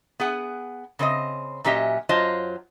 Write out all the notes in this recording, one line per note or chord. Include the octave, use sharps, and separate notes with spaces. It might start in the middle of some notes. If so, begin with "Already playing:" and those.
B3 G#4 F#5
C#3 C4 C5 D#5
A#2 F#3 C#4 G4 D#5 E5
F#2 F#3 F4 C5 D#5 A5